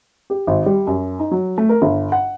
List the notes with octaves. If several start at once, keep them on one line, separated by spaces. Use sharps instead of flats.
G4
G#1
G3
F#2
D#4
F#3
A3
A#4
G1
F#5